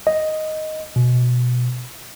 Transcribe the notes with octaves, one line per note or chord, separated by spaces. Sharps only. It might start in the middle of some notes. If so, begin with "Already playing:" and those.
D#5
B2